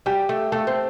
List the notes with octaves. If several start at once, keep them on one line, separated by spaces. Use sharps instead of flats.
G3 G4
A3
A3 A4
C4